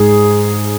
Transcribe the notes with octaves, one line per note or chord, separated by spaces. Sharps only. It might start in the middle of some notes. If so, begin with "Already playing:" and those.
Already playing: G#2 G#4